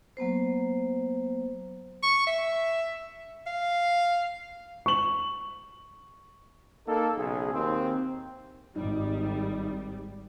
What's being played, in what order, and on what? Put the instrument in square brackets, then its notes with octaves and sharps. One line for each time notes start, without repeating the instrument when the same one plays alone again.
[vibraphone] F#3 A#3 B3 C5
[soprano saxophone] C#6
E5
F5
[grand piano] C#6 F#7
[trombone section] A#3 D#4 A4
B1 C#3 G#4
D#2 C4
[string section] G#1 G3 [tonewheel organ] D#4